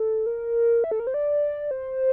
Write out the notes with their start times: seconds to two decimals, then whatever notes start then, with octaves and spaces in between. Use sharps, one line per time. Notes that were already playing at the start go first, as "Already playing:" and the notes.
Already playing: A4
0.26 A#4
0.84 E5
0.91 A4
1.00 A#4
1.07 C5
1.14 D5
1.71 C5